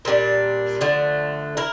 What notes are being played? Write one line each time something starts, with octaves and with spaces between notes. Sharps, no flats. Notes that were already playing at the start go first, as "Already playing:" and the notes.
A#2 G3 D4
D3 F3 A3
E4 A#4